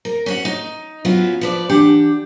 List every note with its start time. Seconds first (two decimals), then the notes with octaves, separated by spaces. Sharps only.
0.05 A#4
0.26 C#4 F#4 F#5
0.45 D#4
1.05 F#3 B3 C#4 E4 F4
1.41 F3 B4 D5
1.69 E3 D4 G4 F#5